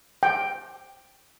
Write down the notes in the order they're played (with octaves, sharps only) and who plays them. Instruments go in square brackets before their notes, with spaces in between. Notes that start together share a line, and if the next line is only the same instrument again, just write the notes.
[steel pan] G5